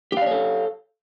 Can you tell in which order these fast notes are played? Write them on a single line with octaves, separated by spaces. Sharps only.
G4 F5 D5 C#5 A4